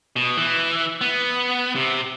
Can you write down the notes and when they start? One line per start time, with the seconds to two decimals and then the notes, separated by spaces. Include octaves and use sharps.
0.16 B2
0.37 E3
1.01 B3
1.76 C3